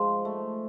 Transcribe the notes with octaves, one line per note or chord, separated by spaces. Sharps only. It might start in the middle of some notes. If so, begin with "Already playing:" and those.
Already playing: G#2 F3
A3